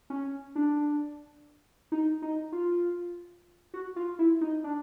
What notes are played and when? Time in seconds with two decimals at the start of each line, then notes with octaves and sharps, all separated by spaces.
0.10 C#4
0.56 D4
1.92 D#4
2.22 D#4
2.52 F4
3.74 F#4
3.96 F4
4.19 E4
4.41 D#4
4.64 D4